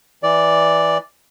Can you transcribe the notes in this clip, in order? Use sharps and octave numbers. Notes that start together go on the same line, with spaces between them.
E3 D5